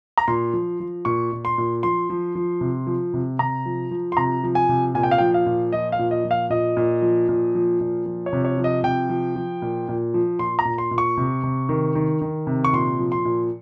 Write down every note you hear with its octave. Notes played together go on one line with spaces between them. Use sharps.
A#5
A#2 C6
F3
F3
A#2 C#6
A#2
C6
A#2
F3 C6
F3
F3
C3
F3
C3
C3 A#5
F3
F3
C6
C3 A#5
F3
G#5
C3
A#2 G#5
G5
F5
F3 G5
F5
A#2
F3 D#5
F5
A#2
D#5
F3
F5
A#2 D#5
A#2
F3
A#2
F3
A#2
F3
C#5
C3
C#5
F3
D#5
C3 G5
F3
F3
A#2
A#2
F3
A#2 C6
A#5
A#2
C6
A#2
C#6
C3
C3
D#3
D#3
D#3
C3
C#6
A#2 C6
F3
C6
A#2